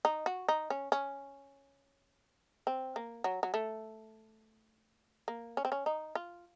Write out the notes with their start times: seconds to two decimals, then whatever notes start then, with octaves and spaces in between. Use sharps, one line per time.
0.05 D#4
0.26 F#4
0.49 D#4
0.70 C#4
0.92 C#4
2.67 C4
2.96 A#3
3.24 F#3
3.43 F#3
3.54 A3
5.28 A#3
5.57 C#4
5.65 C4
5.72 C#4
5.86 D#4
6.15 F4